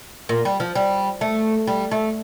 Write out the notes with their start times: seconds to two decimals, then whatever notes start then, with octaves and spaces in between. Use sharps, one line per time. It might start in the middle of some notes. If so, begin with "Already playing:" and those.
0.29 A#2
0.45 G3
0.60 F3
0.75 G3
1.21 A3
1.67 G3
1.91 A3